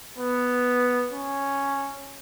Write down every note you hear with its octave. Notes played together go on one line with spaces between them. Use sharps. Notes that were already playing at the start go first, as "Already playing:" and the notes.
B3
C#4